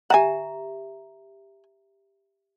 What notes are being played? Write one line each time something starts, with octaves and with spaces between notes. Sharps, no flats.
G4 E5 F#5 G#5 A#5